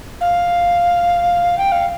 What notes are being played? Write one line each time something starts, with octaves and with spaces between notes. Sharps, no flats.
F5
G5
F5